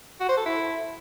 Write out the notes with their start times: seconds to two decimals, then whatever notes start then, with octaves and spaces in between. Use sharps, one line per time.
0.20 F#4
0.29 C5
0.37 A4
0.46 E4